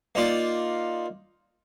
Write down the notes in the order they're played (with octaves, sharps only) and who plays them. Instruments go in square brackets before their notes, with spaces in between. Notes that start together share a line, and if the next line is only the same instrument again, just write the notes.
[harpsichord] A#3 D#4 F4 D5